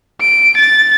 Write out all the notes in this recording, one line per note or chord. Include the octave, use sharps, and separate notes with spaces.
D7
A6